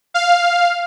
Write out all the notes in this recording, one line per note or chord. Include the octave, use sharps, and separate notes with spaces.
F5